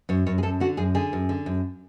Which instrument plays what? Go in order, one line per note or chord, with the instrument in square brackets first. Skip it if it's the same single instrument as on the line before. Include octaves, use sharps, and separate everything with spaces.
[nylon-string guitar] F#2 C#5
F#2 C#5
G#4
F#2 A4
D3 F#4
F#2 G#4
D3 G#4
F#2
D3
F#2